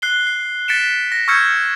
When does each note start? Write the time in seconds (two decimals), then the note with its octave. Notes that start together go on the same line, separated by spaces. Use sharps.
0.02 F#6 C7 G7
0.27 C7
0.68 A6 B6 C#7 D7 E7
1.12 A#6
1.28 C#6 E6 F6 G6 G#6 C#7